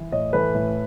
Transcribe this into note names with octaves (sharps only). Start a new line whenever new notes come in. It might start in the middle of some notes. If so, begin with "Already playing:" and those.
Already playing: E3
A2 C#5 D#5
E3 A4 B4
A2